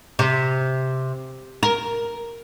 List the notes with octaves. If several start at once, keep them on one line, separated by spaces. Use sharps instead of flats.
C3
A#4